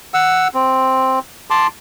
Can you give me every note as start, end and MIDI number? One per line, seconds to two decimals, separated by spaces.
0.14 0.48 78
0.14 0.48 88
0.54 1.19 60
1.50 1.67 81
1.50 1.67 84
1.50 1.67 86